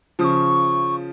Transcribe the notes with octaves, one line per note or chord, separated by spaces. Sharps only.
C#3 F3 D#6
C#6